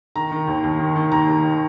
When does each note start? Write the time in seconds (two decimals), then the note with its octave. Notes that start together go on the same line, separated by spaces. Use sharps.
0.16 D#3 A#5
0.31 D#3
0.48 D#2
0.64 D#2
0.79 D#3
0.96 D#3
1.12 D#2 A#5
1.28 D#2
1.44 D#3